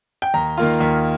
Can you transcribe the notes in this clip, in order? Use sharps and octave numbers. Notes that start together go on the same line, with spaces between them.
G5
D#2 A#5
D#3 A#3 F4
D#2